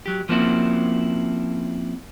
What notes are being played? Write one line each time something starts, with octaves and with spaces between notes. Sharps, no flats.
F#3 G4
F3 A#3 C4 C#4 E4 F#4